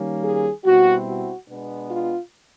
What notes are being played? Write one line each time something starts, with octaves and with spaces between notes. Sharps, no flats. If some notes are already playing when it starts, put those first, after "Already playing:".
Already playing: D#3 G3 A#3 C#4
G#4
B2 G3 C4 E4 F#4
F#4
B2 G#3 B3 D4
F4